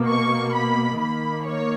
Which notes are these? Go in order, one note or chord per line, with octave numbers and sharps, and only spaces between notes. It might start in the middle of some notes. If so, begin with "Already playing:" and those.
Already playing: B2 A#3
C#6
B5
D#3 A#3 B5
C#5